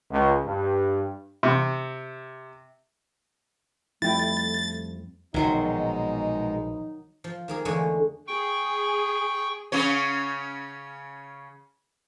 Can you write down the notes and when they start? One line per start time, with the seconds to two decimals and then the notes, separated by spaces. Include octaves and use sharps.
0.10 C#2
0.45 G2
1.43 C3
4.02 F2 G3 A3 E4 G5 A6
5.34 A#1 B2 D#3 F#3 G#3 D#4 C6
7.24 F3
7.48 D#3 A#3 G#4
7.65 E2 D3 G#3 A3 G#4 C#5
8.27 G#4 G5 C#6
9.72 C#3 C#4 C#5